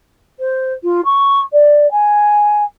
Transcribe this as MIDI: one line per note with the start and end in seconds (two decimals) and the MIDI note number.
0.40 0.73 72
0.84 1.01 65
1.05 1.41 85
1.53 1.90 74
1.91 2.64 80